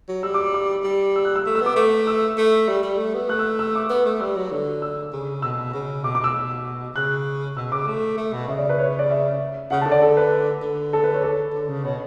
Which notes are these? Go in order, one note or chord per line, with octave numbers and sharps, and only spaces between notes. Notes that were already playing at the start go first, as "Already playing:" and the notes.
F#3
G3 E6
D6
D6
G3
E6
F#6
E6
A3
E6
B3
D6
A3
E6
A3
G3
G3
A3
B3
A3 F#6
E6
E6
D6
B3
A3
G3 E6
F#3
D3
E6
C#3
B2 E6
C#3
B2 D6
D6
B2 E6
C#3 F#6
B2 E6
C#3 D6
A3
A3
B2
C#3 E5
D5
B4
C#5
C#5
D5
E5
C#3 F#5
D3 A5
D5
A4
B4
D3
A4
B4
C#5
A4
D3
C#3
B2 C#5